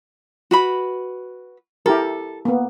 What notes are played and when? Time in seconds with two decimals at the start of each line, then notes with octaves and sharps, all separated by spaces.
0.51 F#4 B4 B5
1.86 E4 G4 A4 A#4
2.45 A#3 B3